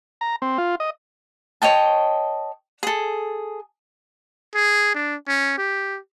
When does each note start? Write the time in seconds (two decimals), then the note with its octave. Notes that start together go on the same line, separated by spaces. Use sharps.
0.21 A#5
0.42 C4
0.58 F4
0.80 D#5
1.62 C#5 D#5 G5 A5
2.83 G#4 A4
4.55 G#4
4.95 D4
5.28 C#4
5.58 G4